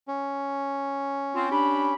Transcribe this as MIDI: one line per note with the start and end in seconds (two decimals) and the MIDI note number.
0.08 1.94 61
1.34 1.47 60
1.34 1.47 65
1.51 1.95 62
1.51 1.95 67
1.51 1.95 83